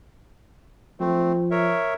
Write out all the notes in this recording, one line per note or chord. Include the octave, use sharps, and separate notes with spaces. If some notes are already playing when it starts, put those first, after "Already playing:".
F3 A3 C4
A#4 C#5 E5